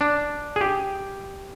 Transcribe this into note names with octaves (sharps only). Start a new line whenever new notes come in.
D4
G#4
G4